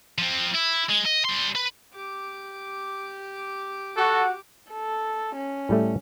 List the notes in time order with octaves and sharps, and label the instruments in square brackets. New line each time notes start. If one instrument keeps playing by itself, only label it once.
[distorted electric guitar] F3 C4
E4
G#3
D#5
G3 C6
B4
[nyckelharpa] G4 D6
[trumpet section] F#4 [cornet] A4
[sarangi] A4
C#4
[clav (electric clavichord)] A2 G3 A3